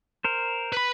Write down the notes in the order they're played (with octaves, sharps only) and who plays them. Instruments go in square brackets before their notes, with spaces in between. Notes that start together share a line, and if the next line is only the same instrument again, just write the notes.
[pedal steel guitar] A#4 C5
[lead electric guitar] B4 B5